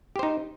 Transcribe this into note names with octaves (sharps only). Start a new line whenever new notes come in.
D#4 G4 C5